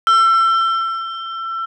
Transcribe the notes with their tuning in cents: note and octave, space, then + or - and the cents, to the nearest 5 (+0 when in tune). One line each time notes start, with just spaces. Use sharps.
E6 +30